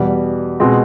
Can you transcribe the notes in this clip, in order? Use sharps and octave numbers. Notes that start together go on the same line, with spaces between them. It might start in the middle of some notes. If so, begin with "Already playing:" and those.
Already playing: E2 B2 G3
B2 G#3 C4